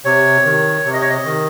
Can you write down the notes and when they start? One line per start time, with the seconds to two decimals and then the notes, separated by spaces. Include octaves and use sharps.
0.05 C3 C#5
0.45 D#3
0.85 C3
0.93 D#5
1.01 C#5
1.10 D#5
1.25 D#3